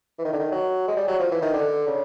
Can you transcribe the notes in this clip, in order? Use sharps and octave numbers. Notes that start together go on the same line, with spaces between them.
E3
D#3
D3
D#3
F#3
G#3
G3
F#3
F3
E3
D#3
D3
C#3